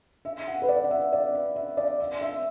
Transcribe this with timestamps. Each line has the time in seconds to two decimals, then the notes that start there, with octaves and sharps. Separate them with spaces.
0.25 E5
0.48 F#5
0.62 B4
0.69 D5
0.84 F#5
0.91 E5
1.12 D5
1.35 E5
1.56 E5
1.77 D5
2.00 E5
2.21 E5